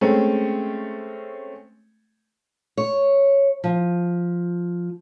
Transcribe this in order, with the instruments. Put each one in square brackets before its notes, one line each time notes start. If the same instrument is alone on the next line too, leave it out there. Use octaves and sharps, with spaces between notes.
[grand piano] G#3 A3 C4 C#4
[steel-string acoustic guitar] C#5
F3